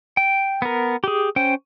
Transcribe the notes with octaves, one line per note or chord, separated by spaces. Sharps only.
G5
B3 A#4
G4 G#4
C#4 C5 G5